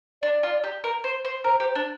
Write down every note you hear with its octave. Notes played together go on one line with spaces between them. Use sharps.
D4 D5
F4
G4
A#4
C5
C5
A#4 C5
G4
C5
D4